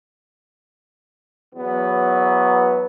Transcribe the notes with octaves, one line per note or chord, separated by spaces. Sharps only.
E2 F#3 B3